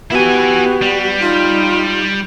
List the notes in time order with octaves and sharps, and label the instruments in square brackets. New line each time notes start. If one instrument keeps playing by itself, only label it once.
[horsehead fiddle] B3 G4 [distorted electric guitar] E4 G#5 [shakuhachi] F#4
[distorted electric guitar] G3
[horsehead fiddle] D#4 [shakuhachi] F4